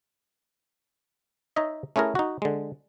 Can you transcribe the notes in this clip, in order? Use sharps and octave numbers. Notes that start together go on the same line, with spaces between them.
D#4 C#5 D#5 E5
A3 C#4 E4 G#4 A#4
D#4 F#4
D3 G#3